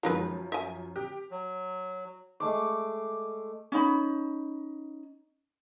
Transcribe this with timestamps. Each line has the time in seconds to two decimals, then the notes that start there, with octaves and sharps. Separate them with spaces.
0.03 F#2 D#3 F3 G#3 B4
0.52 E5 G#5
0.96 G4
1.31 F#3
2.40 G#3 A3 D6
3.72 C#4 D#4 B5